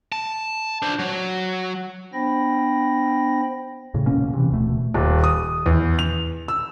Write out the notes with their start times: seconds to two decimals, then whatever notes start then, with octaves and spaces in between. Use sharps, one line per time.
0.12 A5
0.82 D4 C5
0.99 F#3
2.13 B3 D4 C5 G5 B5 A#6
3.94 A2 C#3
4.06 E1 B2 A#3 C#4
4.33 C3 E3
4.51 D1 B2 A3
4.94 D#1
5.24 D#6
5.66 E2
5.99 F7
6.48 E6